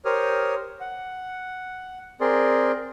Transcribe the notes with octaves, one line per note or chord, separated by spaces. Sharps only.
G4 A#4 C5 C#5 D#6 F6
F#5
C4 G#4 A#4 D5 C6